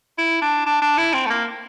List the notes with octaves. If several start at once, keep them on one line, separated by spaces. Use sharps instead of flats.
E4
D4
D4
D4
E4
C4
A3
A#3